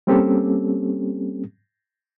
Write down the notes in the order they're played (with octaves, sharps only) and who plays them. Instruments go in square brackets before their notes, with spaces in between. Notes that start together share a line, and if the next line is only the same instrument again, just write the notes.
[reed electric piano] G3 A#3 C4 C#4 G4 A4